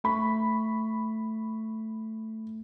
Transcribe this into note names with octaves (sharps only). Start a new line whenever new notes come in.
A3 B5 C#6